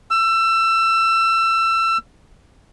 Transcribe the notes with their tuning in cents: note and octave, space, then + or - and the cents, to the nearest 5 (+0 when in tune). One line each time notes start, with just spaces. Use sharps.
E6 +25